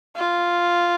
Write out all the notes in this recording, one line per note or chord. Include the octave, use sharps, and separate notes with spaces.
F4